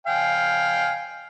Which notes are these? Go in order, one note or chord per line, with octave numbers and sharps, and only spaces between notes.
F5 G5 G#5